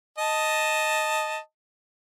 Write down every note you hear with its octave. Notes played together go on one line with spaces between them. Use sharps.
D#5 A5